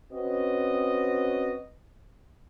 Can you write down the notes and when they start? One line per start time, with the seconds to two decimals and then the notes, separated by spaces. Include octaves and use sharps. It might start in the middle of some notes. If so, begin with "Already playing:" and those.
0.13 C4 C#4 F#4 B4 D#5